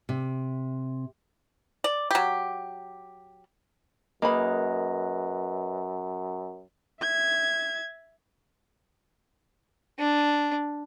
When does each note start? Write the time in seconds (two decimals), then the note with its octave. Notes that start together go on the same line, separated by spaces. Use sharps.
0.09 C3
1.84 D5
2.11 F#3 G4
4.22 F#2 A#3 G#4 B4 D#5 B5
7.01 E5 G#6
9.99 D4